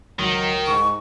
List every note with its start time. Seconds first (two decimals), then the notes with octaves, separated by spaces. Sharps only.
0.19 C#2 D#3 F#3
0.67 G#2 C#6